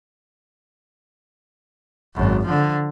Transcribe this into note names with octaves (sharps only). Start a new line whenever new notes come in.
G#1 F#2
D3 F3